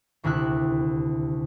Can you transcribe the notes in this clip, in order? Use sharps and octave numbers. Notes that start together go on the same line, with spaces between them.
D#1 D2 C3 E4 F#6